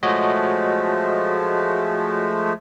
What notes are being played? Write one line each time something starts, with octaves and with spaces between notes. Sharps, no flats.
F3 G#3 A3 F#4 C#5 D#5